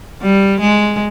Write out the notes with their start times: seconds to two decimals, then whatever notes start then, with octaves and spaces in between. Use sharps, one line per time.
0.22 G3
0.60 G#3